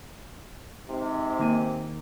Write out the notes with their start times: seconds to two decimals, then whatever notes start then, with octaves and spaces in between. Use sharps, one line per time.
0.89 G#2 C3
1.39 D#3 A#3 G#5